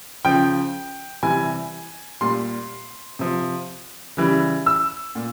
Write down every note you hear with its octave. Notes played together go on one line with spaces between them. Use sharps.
C#3 F3 G5
C3 E3 G3 G#5
A#2 G3 C6
C3 F3
C#3 E3 G3
E6
A#2